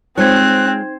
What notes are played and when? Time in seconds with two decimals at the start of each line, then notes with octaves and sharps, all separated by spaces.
0.18 G#3 C4 D#4 F4 C5 C#5 F#6 G#6